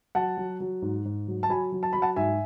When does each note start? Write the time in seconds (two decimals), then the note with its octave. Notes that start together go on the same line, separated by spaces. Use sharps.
0.15 F#3 F#5 A5
0.37 F#3
0.60 F#3
0.82 G#2
1.05 G#2
1.28 F#3
1.43 A5
1.49 F#3 G#5 B5
1.72 F#3
1.83 A5
1.93 F#3 B5
2.02 F#5 A5
2.16 G#2 E5 G#5